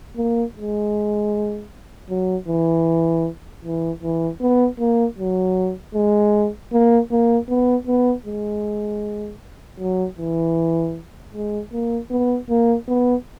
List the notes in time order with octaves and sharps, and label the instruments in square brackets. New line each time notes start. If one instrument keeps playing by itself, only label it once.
[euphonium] A#3
G#3
F#3
E3
E3
E3
B3
A#3
F#3
G#3
A#3
A#3
B3
B3
G#3
F#3
E3
G#3
A#3
B3
A#3
B3